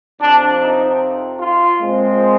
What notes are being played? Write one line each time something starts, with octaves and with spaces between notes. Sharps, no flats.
F2 C3 F3 D4
D#4
F4
A#2 F3 G#3 C4